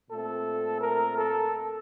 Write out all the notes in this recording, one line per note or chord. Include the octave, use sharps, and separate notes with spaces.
A#2 A3 C4 A4
A#4
A4